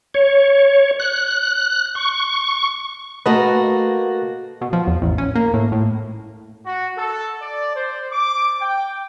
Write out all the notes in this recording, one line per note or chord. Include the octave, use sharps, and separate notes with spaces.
C#5
F#6
C#6
A3 A#3 F#4 B4 D#5 F#5
B2
F3
E2
A1
C#4
A#3
A2
A2
F#4
A4
D5
C5
D6
G5